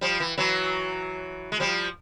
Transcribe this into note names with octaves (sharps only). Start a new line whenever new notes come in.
F3 G3
E3
E3 F#3
G#3
F3 G3